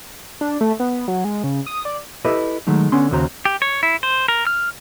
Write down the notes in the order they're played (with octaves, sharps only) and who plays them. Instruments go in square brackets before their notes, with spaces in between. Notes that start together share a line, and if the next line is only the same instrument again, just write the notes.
[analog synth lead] D4
A3
B3
F#3
G#3
C#3
D#6
D5
[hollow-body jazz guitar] E4 G4 A4 B4 D#5 E5
D#3 F#3 G#3 A3 D#4
D3 B3 C#4 C6
D#2 C#3 F#4 C5 A#5
[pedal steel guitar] G4
C#5
E4
C5
A#4
F6